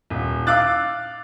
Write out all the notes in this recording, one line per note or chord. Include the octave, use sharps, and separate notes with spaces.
D#1
F5 D6 E6 F#6 A6